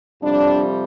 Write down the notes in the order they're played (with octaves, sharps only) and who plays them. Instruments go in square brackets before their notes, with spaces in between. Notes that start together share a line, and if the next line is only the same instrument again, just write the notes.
[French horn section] F2 C3 G3 D4